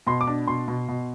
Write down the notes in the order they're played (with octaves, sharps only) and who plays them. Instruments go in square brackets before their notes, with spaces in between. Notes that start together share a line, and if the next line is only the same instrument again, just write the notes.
[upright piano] B2 C6
D6
D4
B2 C6
B2
B2